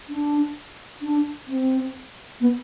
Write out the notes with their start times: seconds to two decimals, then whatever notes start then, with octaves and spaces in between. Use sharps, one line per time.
0.09 D4
1.02 D4
1.48 C4
2.40 B3